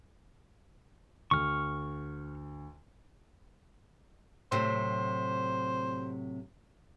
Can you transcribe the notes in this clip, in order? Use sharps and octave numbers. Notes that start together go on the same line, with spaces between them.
D2 C#6 F6
A2 C3 F#3 C5